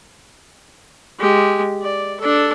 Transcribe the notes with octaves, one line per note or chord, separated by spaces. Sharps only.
G#3 G4
D5
D4 A4